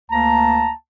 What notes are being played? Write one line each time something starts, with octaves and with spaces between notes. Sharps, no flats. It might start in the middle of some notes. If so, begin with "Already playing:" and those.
D2 A#3 A5 A#5